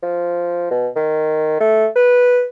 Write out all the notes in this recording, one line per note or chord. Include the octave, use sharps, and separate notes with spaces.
F3
B2
D#3
A3
B4